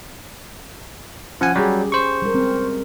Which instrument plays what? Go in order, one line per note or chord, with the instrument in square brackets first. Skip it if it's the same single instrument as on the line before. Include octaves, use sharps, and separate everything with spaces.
[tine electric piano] F3 F#5 G#5 [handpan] C#4
[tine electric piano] F#3 G3 [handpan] G4 G#4
[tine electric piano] C5 C#6
[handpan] G3 G#3 A#4
C4